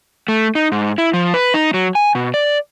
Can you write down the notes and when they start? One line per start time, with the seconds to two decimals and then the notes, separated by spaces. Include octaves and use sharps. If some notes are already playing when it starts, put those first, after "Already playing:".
0.28 A3
0.55 D#4
0.72 G#2
0.98 E4
1.13 F3
1.34 B4
1.54 D#4
1.74 F#3
1.95 G#5
2.15 B2
2.34 D5